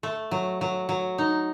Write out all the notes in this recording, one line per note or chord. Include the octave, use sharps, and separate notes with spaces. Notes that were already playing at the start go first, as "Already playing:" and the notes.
A3
F#3
F#3
F#3
D#4